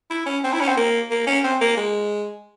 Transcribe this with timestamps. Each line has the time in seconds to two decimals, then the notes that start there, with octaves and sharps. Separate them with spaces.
0.10 E4
0.26 C#4
0.44 C4
0.53 E4
0.61 C#4
0.68 C4
0.77 A#3
1.10 A#3
1.27 C#4
1.44 C4
1.61 A#3
1.77 G#3